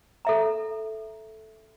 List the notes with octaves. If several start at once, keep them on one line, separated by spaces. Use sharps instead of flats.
A4 E5 A#5